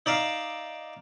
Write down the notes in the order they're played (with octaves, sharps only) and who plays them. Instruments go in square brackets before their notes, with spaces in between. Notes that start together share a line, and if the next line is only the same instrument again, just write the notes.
[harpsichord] D#4 D5 E5 F5